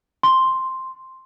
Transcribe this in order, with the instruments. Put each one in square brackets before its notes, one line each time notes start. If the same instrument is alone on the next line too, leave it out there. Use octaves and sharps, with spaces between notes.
[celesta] C6